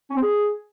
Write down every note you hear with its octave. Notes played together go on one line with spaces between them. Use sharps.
C#4
C4
G#4